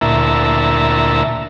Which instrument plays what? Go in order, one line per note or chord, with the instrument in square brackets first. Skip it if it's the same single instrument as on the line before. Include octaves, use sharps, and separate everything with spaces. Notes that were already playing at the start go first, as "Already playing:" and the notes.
[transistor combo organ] D2 A#2 E4 E5 A5 A#5